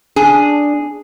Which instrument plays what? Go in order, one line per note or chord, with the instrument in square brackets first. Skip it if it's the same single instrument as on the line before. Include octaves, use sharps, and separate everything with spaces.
[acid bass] D4 [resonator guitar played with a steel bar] G#4